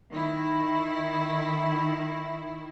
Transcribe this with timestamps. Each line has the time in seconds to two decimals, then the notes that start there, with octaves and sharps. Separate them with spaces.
0.12 D#3 E4